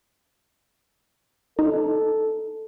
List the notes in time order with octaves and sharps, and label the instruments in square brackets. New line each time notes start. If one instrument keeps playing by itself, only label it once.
[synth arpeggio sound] D#4 [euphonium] A4